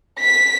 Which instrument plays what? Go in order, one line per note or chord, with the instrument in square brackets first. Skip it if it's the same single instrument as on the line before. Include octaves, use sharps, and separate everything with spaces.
[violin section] B6